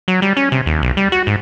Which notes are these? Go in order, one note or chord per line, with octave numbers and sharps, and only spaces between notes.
F#3
G3
C#4
C3
D#2
B1
G3
F#4
G#2